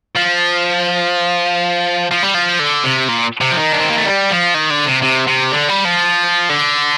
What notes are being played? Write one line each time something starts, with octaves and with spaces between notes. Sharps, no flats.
F3
F3
G3
F3
D3
C3
A#2
C3
F3
D#3
D4
C4
A#3
A3
G3
F3
D#3
D3
C3
C3
C3
D3
G3
F3
D3